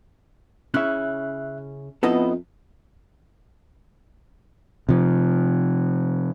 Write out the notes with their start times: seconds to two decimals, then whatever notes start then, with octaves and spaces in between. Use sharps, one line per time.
0.74 C#3 C#4 E4 E5 F#6
2.03 F2 B3 D#4 E4 A4 D#5
4.89 C3 F3